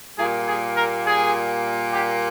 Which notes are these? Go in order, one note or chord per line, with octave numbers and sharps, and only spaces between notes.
A#2 G3 A#3 G#4
G#4
A#4
G#4
G4